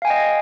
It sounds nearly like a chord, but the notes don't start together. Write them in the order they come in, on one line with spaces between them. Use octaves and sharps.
F5 G#5 G5 D#5